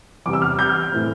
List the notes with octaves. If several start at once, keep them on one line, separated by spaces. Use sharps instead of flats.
E2 C3 G3 D6
E6
F6
G6
F6
A2 E3 A3 C4